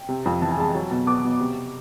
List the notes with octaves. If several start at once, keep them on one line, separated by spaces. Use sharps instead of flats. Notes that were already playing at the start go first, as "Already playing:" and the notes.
Already playing: G5
C3
F2
E3 A5
G#5
G#3 A5
F#3
B2
B3 D6
B2
C3